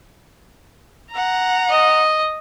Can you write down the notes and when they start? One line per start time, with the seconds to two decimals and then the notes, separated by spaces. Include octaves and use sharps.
1.12 F#5 A#5
1.70 D#5